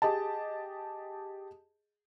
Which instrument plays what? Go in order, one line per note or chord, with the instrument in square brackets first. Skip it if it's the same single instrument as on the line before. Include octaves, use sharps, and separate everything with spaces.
[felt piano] G4 G#4 D#5 A5